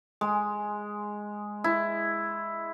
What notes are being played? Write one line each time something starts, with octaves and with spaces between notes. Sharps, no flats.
G#3
E4